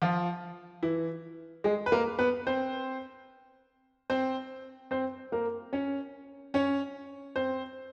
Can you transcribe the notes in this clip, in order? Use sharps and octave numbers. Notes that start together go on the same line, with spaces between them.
F3 F4
E3 E4
G#3 G#4
B4
A#3 A#4
B3 B4
C4 C5
C4 C5
C4 C5
A#3 A#4
C#4 C#5
C#4 C#5
C4 C5